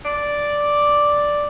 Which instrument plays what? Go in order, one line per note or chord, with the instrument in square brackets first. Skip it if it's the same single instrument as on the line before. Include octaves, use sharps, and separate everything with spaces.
[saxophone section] D5